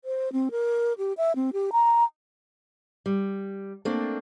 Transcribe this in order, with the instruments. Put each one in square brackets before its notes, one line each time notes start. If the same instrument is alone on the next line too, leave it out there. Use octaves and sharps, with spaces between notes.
[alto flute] C5
C4
A#4
G4
E5
C4
G4
A#5
[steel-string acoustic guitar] G3
A3 A#3 C4 D4